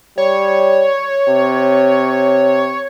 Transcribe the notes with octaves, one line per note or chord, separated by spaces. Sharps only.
G3 C#5
C3